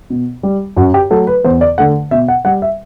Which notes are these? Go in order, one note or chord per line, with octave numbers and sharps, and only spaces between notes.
B2
G3
F#2 F#4
G4
F#3 A3 A4
B4
E2 C5
D5
D3 A3 F#5
B2 E5
F#5
G3 F#5
E5